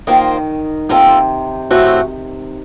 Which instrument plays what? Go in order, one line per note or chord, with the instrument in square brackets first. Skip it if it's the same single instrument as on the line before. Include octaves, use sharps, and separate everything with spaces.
[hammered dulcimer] D#3 [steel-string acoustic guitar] A#3 F4 C5 D#5
[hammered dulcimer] C3 [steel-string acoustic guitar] A#3 F4 A4
[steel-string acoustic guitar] A2 A3 C4 F#4